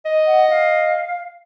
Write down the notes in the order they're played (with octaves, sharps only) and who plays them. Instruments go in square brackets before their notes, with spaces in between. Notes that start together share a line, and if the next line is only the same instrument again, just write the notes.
[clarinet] D#5
[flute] F#5
F5